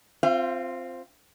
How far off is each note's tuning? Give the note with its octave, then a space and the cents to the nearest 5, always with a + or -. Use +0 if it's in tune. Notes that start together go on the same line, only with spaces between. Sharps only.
C4 +0 F4 +5 E5 +45